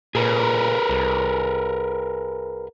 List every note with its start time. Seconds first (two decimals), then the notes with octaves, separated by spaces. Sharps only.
0.15 A#2 G#4 A#4 B4
0.90 C2